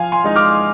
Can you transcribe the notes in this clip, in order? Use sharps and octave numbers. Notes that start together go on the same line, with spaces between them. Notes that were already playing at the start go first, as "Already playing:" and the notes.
Already playing: F3 F5 G#5
G#5 C6
G#3 D#4
D6 F6